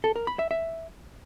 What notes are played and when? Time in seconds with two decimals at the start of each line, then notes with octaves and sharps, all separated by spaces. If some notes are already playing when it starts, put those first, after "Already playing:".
0.04 A4
0.16 A#4
0.27 B5
0.39 E5
0.51 E5